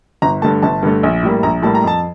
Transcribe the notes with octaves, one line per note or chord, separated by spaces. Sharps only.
G1 A#5
G2 D3 A3 A5
G1 A5
G2 D3 A3
A#1
A2 G3 A#3
A#1 A#5
A2 G3 A#3 A5
A#5
F2 A5